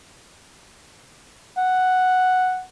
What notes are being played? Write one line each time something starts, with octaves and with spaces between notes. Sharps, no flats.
F#5